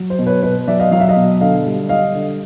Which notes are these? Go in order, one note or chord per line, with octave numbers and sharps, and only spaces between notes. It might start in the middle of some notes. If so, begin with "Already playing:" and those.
Already playing: F#3
C5
B2
B4 C#5
B2 B4
F#3 D5 E5
D#5 F5
F#3 F5
E5
D#5 F5
B2
D3 D#5 F5
G3
G3 D#5 F5
D3